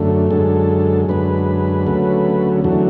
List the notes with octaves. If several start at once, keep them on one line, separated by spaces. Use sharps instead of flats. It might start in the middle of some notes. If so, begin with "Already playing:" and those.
Already playing: F#2 D3 A3
F#2 D3 G#3 A4
F#2 D3 G#3 B4
D2 C#3 F#3 A3
E2 D3 F#3 A3